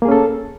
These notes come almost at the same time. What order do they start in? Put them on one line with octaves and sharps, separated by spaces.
A#3 G#4 C#4 A4